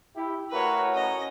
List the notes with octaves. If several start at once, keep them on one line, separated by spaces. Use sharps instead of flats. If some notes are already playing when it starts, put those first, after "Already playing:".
E4 G4
A2 F#4 A#4 B4 C#5
C#4 D#5